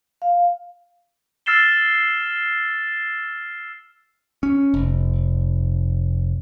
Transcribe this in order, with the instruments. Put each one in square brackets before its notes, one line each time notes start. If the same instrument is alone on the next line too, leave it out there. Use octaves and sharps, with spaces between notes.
[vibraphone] F5
[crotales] E6 F6 A6 C7 E7 G7
[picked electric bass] C#4
F1